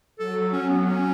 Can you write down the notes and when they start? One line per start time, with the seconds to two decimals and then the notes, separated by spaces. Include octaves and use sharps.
0.19 F#3 A4
0.52 C#4
0.69 B3
0.85 C#4